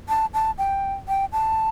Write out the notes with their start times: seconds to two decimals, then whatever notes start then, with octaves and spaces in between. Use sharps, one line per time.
0.09 A5
0.34 A5
0.58 G5
1.08 G5
1.32 A5